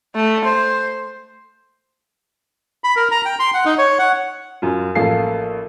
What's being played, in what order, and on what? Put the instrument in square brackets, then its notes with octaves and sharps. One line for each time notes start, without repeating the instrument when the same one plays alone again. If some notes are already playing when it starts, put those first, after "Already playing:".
[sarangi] A3
C5
[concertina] B5
A#4
A#5
G5
C6
F#5
D#4
C#5
F#5
[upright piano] F#2 F4
A1 F3 A#3 A4 F5 C7